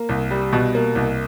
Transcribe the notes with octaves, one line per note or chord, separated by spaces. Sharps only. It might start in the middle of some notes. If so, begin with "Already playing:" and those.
Already playing: A#3
C2
G3
B2
A#3
C2